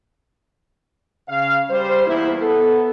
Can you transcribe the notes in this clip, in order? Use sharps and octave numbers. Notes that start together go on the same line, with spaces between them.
C#3 F5
G3 C5
E2 A#3 E4
B3 A4